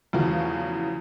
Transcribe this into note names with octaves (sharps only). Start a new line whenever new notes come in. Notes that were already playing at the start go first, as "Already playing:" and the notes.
E2 C#3 E3 F3 A3 F#4